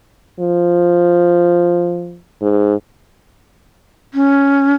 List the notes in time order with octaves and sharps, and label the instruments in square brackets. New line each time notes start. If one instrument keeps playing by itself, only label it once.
[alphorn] F3
G#2
[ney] C#4